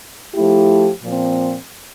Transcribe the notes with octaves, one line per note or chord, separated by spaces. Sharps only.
F3 A3 E4 G4
A#2 F3 C4